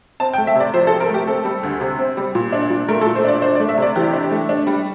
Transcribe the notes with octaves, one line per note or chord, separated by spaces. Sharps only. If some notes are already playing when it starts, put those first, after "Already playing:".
C4 A5
G5
A3
E5
C3 D5
F3 C5
A4
C4
A#4
A3 G4
C4 A4
G3
D2
C3
C4
G3
A#2
D4
A#2
A3 A#4
A4
A#2
C5
D4 D5
D4 C5
D5
A3
E5
C3 D5
E3 G4
D4
A3
D4
G3